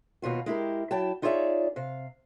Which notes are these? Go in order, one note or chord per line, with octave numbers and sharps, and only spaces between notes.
D#2 B2 F4 F#4
G#3 E4 G4 A#4
F#3 E4 G5 A5
D#4 F4 G#4 C#5 D5 E5
C3 F5